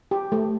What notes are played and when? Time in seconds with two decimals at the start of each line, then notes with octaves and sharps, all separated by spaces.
0.11 G4
0.32 A3